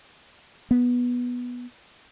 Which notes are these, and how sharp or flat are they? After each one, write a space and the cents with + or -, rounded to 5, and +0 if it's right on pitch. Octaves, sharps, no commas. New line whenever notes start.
B3 -10